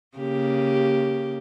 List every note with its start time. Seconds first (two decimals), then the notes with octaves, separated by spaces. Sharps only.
0.17 C#3 A#3 G4